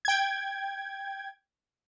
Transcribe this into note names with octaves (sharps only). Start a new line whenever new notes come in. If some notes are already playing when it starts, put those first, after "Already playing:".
G5 G#6